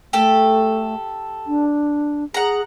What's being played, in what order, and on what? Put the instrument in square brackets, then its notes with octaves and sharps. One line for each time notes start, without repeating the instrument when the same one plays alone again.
[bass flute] A3 [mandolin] G4 A4
[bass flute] D4
[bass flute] G#4 [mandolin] F#5 A#5